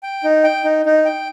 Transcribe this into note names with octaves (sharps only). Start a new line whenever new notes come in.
G5
D#4
G5
D#4
D#4
G5